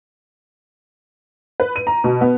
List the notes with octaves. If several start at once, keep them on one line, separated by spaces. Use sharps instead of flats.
B4
D#7
A#5
B2
B3